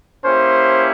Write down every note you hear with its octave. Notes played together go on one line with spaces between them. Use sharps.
A#3 C#4 E4 G4 C5